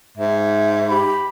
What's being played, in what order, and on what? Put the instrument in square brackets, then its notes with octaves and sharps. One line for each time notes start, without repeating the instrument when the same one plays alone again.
[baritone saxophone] G#2 [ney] E5
[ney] G4 [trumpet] B5